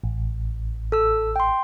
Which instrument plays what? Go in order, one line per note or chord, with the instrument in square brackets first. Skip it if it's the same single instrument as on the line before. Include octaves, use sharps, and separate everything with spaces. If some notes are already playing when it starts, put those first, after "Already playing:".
[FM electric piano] A1
[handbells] A4 E6
G5 C6